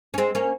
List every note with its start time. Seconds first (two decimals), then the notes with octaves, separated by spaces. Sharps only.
0.14 C#4
0.18 G#3 C4
0.35 A#3 C#4